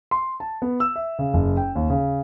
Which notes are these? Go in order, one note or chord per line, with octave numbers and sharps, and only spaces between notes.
C6
A5
B3
E6
E5
C#3
F#1
G5
D#2
C#3